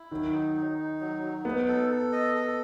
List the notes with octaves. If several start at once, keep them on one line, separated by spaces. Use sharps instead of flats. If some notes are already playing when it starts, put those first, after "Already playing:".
Already playing: E4
D#3 F#3
D#4
D#4
D#4
F#3
F#3
B3 D#4
A4
A4
D#5
A4